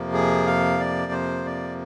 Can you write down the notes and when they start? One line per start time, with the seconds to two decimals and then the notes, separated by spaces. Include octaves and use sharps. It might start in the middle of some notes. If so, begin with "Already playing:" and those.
Already playing: F2 C3 F3 A#3
0.14 G#4
0.47 F5
0.80 D5
1.12 C5
1.45 D5